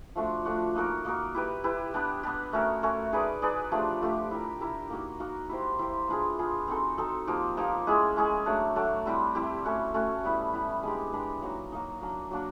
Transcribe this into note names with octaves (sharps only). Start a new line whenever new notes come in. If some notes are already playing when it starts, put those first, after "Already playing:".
F3 A3 D4 F#4
F3 A3 D4 F#4
A#3 D#4 F#4 A#4
A#3 D#4 F#4 A#4
E4 G4 B4
E4 G4 B4
B3 D4 G4
B3 D4 G4
A3 C#4 F#4 A#4
A3 C#4 F#4 A#4
D#4 G#4 B4 D5
D#4 G#4 B4 D5
F3 A3 D4 G4
F3 A3 D4 G4
E4 G4 A#4
E4 G4 A#4
A#3 D#4 F#4 A#4
A#3 D#4 F#4 A#4
E4 G4 C5
E4 G4 C5
B3 D4 F4 G#4
B3 D4 F4 G#4
C4 D#4 F#4 A4
C4 D#4 F#4 A4
F3 A#3 D#4 G4
F3 A#3 D#4 G4
G#3 C#4 E4 G#4
G#3 C#4 E4 G#4
F#3 A3 D4
F#3 A3 D4
G3 C4 E4 G4
G3 C4 E4 G4
A3 C#4 F#4
A3 C#4 F#4
G3 B3 E4
G3 B3 E4
G#3 B3 D4 G4
G#3 B3 D4 G4
F#3 A#3 D#4
F#3 A#3 D#4
F#3 A#3 D4
F#3 A#3 D4